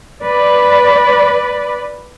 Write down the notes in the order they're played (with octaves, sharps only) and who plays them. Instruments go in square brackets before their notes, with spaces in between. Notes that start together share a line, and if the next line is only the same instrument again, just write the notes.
[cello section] B4 D5